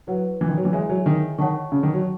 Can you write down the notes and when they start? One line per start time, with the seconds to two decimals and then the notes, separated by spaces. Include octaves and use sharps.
0.07 F#3 E4 B4 F#5
0.41 E3
0.49 D#3
0.57 F#3
0.65 E3
0.73 G#3 E4 G#4 C#5 E5 G#5
0.89 F#3
1.06 D#3
1.38 D#3 C#5 F#5 A5 C#6
1.72 C#3
1.83 D#3
1.93 F#3